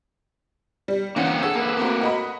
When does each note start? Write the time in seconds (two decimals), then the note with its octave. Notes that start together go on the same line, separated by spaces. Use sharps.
0.88 G3
1.16 D3 E3 A#3 C4 C#4 F#5
1.43 G#4 A4
1.55 A#3 B4
1.77 A3 C4 F#4
2.01 F#4 D#5 B5